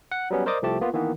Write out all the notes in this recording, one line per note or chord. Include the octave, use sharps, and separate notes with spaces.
F#5
F#3 G3 B3 C#4
A#4 C5 D5 D#5 D6 D#6
C2 F3 A3 G4 A5
A#3 B3 F4
D#3 E3 A#3 B3